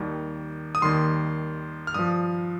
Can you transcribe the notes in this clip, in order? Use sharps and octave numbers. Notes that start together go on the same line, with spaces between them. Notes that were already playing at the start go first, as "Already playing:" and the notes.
Already playing: D#2 D#3 G3
D#6
D#2 D#3 G3 C6
F6
G2 F3 D#6